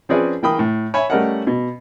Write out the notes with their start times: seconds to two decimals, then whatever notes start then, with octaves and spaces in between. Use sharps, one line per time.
0.09 F3 C4 C#4 G#4 B4 D5
0.43 E3 A#3 G5 B5 D#6
0.59 A2
0.94 C#5 E5 G#5 B5
1.10 G3 A3 C#4 A#4 D#5 F#5
1.47 B2